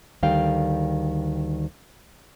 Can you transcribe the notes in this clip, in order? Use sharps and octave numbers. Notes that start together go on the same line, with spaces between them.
D2 D#3 G3 F5 G5